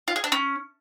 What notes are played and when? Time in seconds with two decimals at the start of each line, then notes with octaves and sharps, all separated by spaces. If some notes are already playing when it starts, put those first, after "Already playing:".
0.08 F4
0.16 G#4
0.24 D4
0.32 C#4